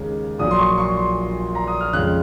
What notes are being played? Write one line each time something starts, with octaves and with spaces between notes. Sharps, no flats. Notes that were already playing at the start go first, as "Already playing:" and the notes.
Already playing: D#2 C#3 G#3
A#1 A#2 F#3 D#6
C6
C#6
C#6
C6
A#5
D#6
F6
F2 C#3 G#3 F#6